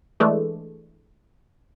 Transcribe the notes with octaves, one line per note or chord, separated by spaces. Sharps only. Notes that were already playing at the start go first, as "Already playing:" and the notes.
E3 G#3 A3 D4